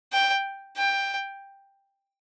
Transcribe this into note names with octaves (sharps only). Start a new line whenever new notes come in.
G5
G5